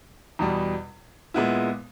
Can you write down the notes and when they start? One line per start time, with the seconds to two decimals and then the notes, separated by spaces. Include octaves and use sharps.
0.39 E2 B2 G3
1.34 A#2 G#3 B3 E4